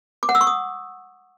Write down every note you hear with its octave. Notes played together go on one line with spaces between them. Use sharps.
D6
F#5
E6
C#6
D#6